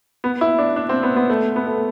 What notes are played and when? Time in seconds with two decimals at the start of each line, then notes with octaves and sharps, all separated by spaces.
0.24 B3
0.41 E4
0.59 D4
0.76 D4
0.89 C4
1.03 B3
1.16 B3
1.30 A3
1.56 B3
1.67 A3